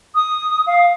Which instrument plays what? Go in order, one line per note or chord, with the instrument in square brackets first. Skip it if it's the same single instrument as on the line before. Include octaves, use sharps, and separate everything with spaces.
[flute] D#6
F5